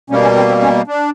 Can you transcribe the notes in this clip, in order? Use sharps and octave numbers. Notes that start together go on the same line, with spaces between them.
B2 G3 A#3 C#4
C#4
C4
C4
C#4
D4